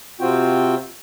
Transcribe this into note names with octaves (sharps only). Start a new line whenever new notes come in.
C3 C4 F4 F#4 G5